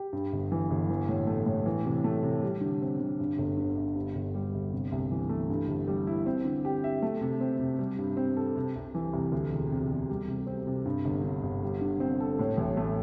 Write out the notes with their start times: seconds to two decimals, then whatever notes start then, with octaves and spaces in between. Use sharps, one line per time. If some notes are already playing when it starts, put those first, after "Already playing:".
Already playing: G4
0.13 G2
0.32 G1
0.52 E3
0.71 G1
0.89 E3
1.09 A2
1.27 A3
1.46 A2
1.66 E3
1.85 C3
2.04 A3
2.23 C3
2.43 G3
2.61 D3
2.82 C4
3.00 D3
3.20 G2
3.38 G1
3.57 D3
3.77 G1
3.95 G2
4.15 G1
4.35 G3
4.54 G1
4.72 C3
4.92 C2
5.11 E3
5.29 A3
5.50 G2
5.68 G1
5.88 G3
6.07 E4
6.26 C4
6.45 D3
6.65 G4
6.84 E5
7.02 A3
7.21 C3
7.41 C4
7.59 C3
7.79 G3
7.99 G2
8.17 C4
8.37 A4
8.55 C3
8.75 C2
8.94 E3
9.13 C2
9.32 D2
9.52 E1
9.71 C3
9.90 E1
10.10 G3
10.28 C3
10.47 C4
10.67 C3
10.85 G2
11.05 G1
11.24 D3
11.43 G1
11.62 G3
11.81 D3
12.00 C4
12.20 A4
12.39 A2
12.57 A1
12.77 A3